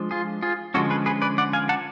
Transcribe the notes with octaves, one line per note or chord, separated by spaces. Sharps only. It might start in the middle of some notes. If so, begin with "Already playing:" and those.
Already playing: F3 G#3 D4
F4 G#4
F4 G#4
D3 F3 G#3 C#4 F#4 A4
G#4 B4
G#4 B4
B4 D5
D5 F#5
F5 G#5
F#5 A5